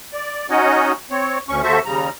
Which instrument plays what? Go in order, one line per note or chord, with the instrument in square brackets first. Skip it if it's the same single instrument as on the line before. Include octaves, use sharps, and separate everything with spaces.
[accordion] D5
C#4 D#4 F#4 C#5 D#5 F#5
C4 C#5
D2 C#4 C#6
D#2 F#4 A4 C5 E5 C#6
D#2 C#3 G3 A#5